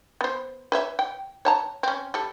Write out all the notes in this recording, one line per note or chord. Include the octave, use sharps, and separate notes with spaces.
B3 C5
B4 C#5 E5
G5
C#5 A5 A#5
C4 C#4
G3 A4